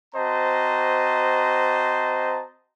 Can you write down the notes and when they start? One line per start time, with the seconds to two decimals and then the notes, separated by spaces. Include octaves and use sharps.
0.15 C4 F#4 C5 D#5 A5 A#5